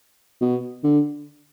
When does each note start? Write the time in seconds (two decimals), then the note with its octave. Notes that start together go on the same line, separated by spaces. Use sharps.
0.41 B2
0.84 D3